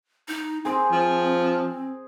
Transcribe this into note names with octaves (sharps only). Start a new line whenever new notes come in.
D#4
C4 G#4 C5
F3